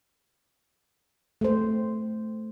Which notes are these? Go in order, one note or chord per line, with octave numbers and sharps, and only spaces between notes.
A3 C5